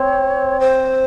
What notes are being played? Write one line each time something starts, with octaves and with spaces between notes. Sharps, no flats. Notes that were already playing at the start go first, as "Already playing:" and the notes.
Already playing: C4 C#5
C5